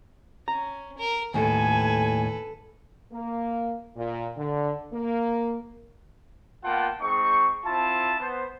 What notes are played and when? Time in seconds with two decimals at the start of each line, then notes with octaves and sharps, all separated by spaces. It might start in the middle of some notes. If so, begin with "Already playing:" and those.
0.48 C#4 A#5
0.98 A#4
1.34 D#2 A2 A4 B4 G#5
3.12 A#3
3.96 A#2
4.37 D3
4.92 A#3
6.64 A#3 B3 F4 F#5 G5 A5
7.01 G#3 C4 D#4 C#6
7.64 C4 E4 F4 A5
8.19 B3 C5